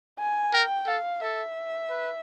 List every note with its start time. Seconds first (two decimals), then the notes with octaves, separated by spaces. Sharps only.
0.19 G#5
0.53 A#4 G5
0.87 A4 F5
1.22 A4 E5
1.90 B4